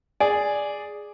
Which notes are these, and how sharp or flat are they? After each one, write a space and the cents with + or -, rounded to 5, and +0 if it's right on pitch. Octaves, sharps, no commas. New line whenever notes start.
G#4 +0 D5 +0